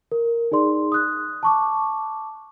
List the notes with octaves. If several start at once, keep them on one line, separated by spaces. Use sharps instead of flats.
A#4
D#4 G#4 D5 C6
D#6 F#6
A5 C#6 D6